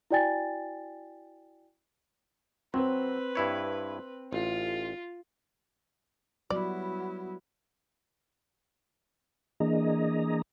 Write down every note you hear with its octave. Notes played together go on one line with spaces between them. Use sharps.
E4 F#4 D5 G5 G#5 A6
F#3 C4 B4
G2 E4 C#5
A1 F4
F#3 G3 B3 E4 F#4 D5
E3 A#3 D4 G#4 D#5 A#5